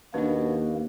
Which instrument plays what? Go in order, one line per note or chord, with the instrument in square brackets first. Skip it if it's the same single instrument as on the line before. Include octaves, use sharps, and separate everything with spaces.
[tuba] D#2 [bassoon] B2 [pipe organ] A#3 [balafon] C#4 D4